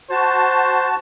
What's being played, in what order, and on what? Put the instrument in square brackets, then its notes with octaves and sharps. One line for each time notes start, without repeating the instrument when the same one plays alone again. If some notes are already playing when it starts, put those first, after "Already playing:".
[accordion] F#4 A5 [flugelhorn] C5